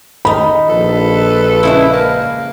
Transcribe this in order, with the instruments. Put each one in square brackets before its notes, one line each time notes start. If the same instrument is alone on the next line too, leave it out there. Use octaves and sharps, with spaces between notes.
[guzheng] D#3 D#4 [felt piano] B5
[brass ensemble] A#1 B4 [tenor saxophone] A4
[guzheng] C#3 G#3 D4 [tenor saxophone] E4
[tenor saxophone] A#3